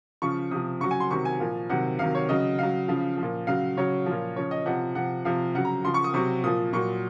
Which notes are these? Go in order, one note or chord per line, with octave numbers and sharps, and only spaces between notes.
C#3 F3 C#6
C3 F3 D#6
C#3 F#3 C#6
G#5
C6
C3 D#3 F#3 C#6
G#5
A#2 F3
C3 D#3 F#3 F#5
C3 D#3 F#3 F5
C#5
C#3 F#3 D#5
C#3 F#3 F5
C#3 F3
A#2 F3
C#3 F#3 F5
C#3 F#3 C#5
A#2 F3
C#3 F3 C#5
D#5
C3 F3 F#5
C3 F3 F#5
C3 F3 F5
C#3 F#3 F#5
A#5
C#3 F3 C6
C#6
D#6
C3 F#3 C#6
A#2 F3 D#6
A#2 F#3 C#6